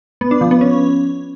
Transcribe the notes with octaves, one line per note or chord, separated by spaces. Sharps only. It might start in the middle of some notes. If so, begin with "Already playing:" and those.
B3
D4
F3
B3
C#4